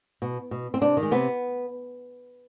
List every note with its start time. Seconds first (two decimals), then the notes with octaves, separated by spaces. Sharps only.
0.22 B2
0.51 B2
0.74 C4
0.81 C3 D4
0.97 D#3
1.03 G#3
1.11 C3 B3